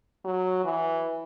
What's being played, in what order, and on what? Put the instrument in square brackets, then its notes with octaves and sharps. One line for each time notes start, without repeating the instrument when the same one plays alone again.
[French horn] F#3
E3